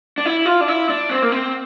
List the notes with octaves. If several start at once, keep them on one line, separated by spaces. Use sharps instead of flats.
D4
E4
F4
D4
E4
D4
C4
A#3
C4